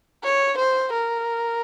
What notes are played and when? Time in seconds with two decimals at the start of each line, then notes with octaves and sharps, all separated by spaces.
0.24 C#5
0.58 C5
0.93 A#4